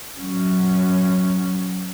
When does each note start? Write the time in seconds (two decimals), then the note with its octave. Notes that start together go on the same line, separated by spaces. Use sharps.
0.18 F#3 C#4